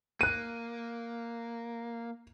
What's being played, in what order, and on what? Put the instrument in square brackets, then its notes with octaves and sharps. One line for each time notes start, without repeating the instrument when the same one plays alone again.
[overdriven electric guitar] A#3 [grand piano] F#6 D#7